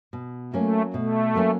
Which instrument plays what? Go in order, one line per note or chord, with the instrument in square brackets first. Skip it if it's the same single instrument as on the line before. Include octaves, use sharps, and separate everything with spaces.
[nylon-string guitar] B2
[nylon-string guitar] F#3 A#3 C#4 [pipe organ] A3
[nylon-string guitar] B2 [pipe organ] A3
[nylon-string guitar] F#3 A#3 C#4